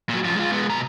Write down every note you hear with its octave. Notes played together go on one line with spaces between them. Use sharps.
A#2 F#3
F#2 F3
G#3 F4
G#3 B3
B2 A#5